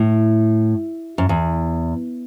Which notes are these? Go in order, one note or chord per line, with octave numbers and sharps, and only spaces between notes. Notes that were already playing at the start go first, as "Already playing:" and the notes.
Already playing: A2
F#2
E2